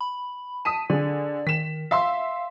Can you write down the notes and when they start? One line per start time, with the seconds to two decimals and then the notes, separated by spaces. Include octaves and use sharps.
0.01 B5
0.65 A5 D#6 B6 D#7
0.90 D3 G#4 D5
1.47 D#3 B6 E7
1.91 E5 F5 C6 E6